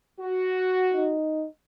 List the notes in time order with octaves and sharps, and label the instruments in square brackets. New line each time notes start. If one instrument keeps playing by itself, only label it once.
[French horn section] F#4
[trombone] D#4